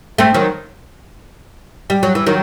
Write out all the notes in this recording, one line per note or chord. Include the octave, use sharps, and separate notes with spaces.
A3 C4
D#3 F#3
G3
F#3
E3
D#3 F#3